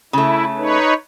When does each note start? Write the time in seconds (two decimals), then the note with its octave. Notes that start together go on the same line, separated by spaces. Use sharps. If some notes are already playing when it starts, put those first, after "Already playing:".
0.13 C#3 A3 E4
0.58 D#4 B4 C#5